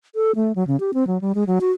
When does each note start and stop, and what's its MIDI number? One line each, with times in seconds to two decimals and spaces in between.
0.15 0.31 69
0.35 0.52 57
0.55 0.66 54
0.67 0.79 49
0.80 0.91 67
0.94 1.07 60
1.07 1.20 54
1.21 1.32 55
1.35 1.44 56
1.47 1.59 54
1.61 1.71 66